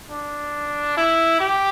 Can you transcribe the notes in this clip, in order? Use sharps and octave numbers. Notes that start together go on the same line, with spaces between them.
D4
E4
G4